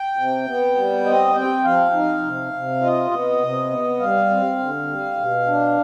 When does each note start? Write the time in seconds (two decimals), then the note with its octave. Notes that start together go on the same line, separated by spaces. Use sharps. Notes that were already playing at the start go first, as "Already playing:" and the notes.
Already playing: G5
0.17 C3
0.47 B3
0.76 G3
1.05 C4 D#5
1.35 C4 G5
1.64 F3 F5
1.93 D#4
2.23 C3
2.53 C3
2.82 F4 D#5
3.11 B3
3.41 C3
3.70 B3
4.00 G3 F5
4.30 C4
4.59 D3
4.88 G3
5.17 B2
5.46 D4